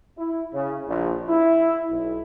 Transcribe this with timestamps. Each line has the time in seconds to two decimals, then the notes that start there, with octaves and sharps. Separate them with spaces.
0.18 E4
0.54 C#3
0.88 A#1
1.28 E4
1.90 B1